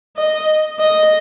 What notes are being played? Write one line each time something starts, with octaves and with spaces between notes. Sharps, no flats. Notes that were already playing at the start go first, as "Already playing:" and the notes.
D#5
D#5